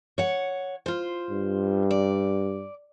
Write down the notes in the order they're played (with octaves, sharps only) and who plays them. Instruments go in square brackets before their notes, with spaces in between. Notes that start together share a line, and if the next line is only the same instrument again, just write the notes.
[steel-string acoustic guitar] C#5 F#5
F4 C5
[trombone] G2
[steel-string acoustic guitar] D5